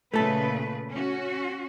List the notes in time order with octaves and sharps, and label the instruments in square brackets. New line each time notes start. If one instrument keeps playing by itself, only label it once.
[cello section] A#2 C#3 B4 [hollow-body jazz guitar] A3 A4
[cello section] C#4 F#4